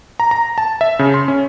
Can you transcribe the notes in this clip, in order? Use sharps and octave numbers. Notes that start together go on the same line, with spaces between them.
A#5
A#5
A5
E5
C#3
C6
C#4